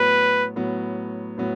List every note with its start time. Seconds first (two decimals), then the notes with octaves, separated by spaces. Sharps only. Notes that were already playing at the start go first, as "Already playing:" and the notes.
Already playing: A2 F#3 B3 B4
0.56 A2 F#3 B3
1.38 A2 F#3 B3